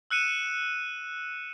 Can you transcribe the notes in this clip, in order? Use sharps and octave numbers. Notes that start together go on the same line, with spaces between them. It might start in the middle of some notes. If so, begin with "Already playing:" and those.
E6 F#6 C#7 D#7 E7